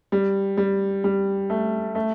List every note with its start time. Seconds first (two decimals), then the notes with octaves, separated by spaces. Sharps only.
0.12 G3
0.57 G3
1.04 G3
1.50 A3
1.95 A3